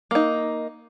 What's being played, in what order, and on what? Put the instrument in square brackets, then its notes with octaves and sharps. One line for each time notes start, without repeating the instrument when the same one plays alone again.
[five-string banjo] A#3 D#4